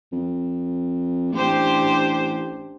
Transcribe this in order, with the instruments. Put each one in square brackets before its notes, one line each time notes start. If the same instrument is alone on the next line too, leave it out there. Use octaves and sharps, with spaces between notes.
[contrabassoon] F2
[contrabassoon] A1 [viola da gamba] D4 G4 C5